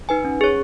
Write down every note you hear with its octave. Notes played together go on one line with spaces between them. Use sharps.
D#4 B4 G#5
C#4
G#4 C#5